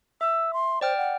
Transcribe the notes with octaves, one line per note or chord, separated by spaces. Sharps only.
E5 E6
C6
C5 D5 G5 F6
F#5